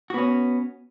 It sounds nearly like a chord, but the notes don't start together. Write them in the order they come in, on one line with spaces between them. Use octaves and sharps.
F#4 B3 C#4